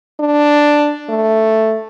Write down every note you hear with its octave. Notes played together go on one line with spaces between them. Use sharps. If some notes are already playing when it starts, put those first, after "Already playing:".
D4
A3